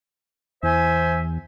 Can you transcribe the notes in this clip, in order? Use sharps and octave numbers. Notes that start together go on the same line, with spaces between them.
E2 C5 E5 G#5